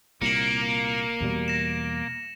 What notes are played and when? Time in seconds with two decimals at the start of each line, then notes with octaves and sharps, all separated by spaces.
0.22 C2 A#2 A#3 C#7 E7 F#7
1.20 E2 B2 G3
1.48 A#6 E7